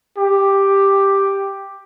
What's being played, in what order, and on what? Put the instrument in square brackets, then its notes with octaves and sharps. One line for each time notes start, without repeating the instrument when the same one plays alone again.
[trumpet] G4